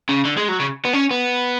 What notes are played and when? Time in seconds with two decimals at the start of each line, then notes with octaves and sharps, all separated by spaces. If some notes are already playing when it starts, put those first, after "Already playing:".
0.09 C#3
0.25 D3
0.37 G#3
0.49 F#3
0.60 C#3
0.85 B3
0.93 C#4
1.11 B3